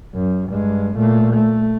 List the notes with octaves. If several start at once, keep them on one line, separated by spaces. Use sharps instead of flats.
F#2
G2 G#3
A#2 A3
A3